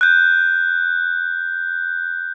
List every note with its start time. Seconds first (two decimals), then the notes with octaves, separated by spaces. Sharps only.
0.01 F#6 G6